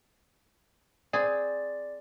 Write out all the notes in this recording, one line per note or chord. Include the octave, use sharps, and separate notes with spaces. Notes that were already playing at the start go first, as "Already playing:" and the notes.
C4 G#4 D5